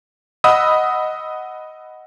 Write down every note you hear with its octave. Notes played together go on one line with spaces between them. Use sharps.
D#5 F#5 B5 D#6 E6